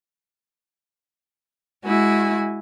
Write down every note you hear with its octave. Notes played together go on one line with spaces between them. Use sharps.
G#3 E4 F#4 G#5